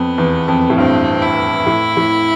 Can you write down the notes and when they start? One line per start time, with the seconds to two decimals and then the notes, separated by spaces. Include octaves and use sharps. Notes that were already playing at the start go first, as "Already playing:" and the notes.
Already playing: F2 B3
0.18 E2
0.48 F2
0.70 A2
0.78 G2 C4
1.22 E4
1.66 A2
1.97 A2